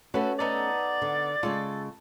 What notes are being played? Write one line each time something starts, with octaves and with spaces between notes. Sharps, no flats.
A3 C#4 F#4 A4 B4
B3 D#4 A4 D5
D3
C#3 G#3 F4 A4